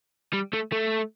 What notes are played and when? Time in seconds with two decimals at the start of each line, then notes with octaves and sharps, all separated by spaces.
0.33 G3
0.53 A3
0.72 A3